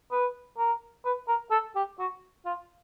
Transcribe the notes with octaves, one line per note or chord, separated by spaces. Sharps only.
B4
A#4
B4
A#4
A4
G4
F#4
F4